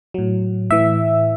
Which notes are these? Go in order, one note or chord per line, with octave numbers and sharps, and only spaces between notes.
A2 F#3
A2 E3 E5